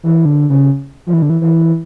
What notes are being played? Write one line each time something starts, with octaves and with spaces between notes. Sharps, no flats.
E3
D3
C#3
F3
E3
D3
E3
E3